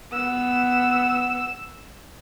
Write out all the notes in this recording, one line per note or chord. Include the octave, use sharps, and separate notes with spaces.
B3 E6